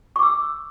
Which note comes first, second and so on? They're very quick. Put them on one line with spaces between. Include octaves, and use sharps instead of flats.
C#6 D6 E6